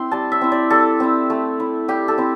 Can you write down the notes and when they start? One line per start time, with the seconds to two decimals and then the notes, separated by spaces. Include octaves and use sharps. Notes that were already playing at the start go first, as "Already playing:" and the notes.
Already playing: C4 E4 C6
0.11 G3 A5
0.32 E5
0.41 C4 E4
0.52 D5
0.70 G3 A4
1.00 C4 E4
1.30 A3
1.60 E4
1.88 G3 G4
2.08 A4
2.18 C4 E4